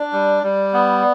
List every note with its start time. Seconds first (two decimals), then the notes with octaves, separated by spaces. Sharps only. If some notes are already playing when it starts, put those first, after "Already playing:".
Already playing: D4 D5
0.12 G3
0.43 G3
0.73 B3